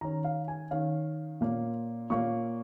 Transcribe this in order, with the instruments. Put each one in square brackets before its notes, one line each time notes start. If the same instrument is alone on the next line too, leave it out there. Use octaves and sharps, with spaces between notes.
[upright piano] D#3 C#4 A#5
F5
G#5
D#3 C#4 F5
A#2 A#3 C#4
A#2 A#3 C#4 C#6